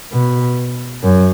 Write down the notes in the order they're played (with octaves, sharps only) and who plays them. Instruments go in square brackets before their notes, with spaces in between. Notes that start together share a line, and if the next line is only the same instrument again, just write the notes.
[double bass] B2
F#2